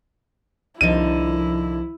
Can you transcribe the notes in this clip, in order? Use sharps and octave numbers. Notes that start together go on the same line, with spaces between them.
C2 D3 D#3 F3 D#4 E4 D#7